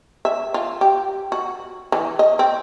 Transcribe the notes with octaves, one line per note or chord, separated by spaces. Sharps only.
E5
F4
G4
F#4
E3
D#5
C4